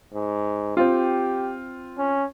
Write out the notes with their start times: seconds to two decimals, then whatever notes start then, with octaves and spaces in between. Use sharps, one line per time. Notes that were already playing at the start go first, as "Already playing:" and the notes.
0.14 G#2
0.77 C4 F4 G4
1.98 C#4